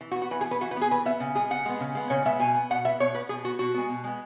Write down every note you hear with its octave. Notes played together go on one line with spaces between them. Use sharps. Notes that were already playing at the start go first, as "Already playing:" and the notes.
E3
F#4
B3
F#4
E3 B4
G#4
B3
B4
E3 F#4
B4
B3
G#4
E3 B4
B3 E5
C#3
G#3 B3 G#4
C#3 F#5
G#3 B3
C#3
G#3 B3
C#3 C#5
G#3 B3 E5
B2 G#5
B3
B2 F#5
B3 E5
B2 C#5
B3 B4
B2 G#4
B3 F#4
B2 F#4
G#3 B3
B2
G#3 B3